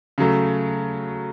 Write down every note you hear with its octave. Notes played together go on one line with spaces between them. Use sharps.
C#3 F#3 A3